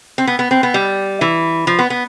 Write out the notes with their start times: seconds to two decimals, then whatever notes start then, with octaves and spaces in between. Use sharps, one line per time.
0.18 C4
0.27 B3
0.39 B3
0.51 C4
0.63 B3
0.74 G3
1.21 E3
1.67 F3
1.79 B3
1.90 B3